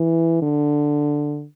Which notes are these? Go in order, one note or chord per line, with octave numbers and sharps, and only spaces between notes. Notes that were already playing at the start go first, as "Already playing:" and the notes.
Already playing: E3
D3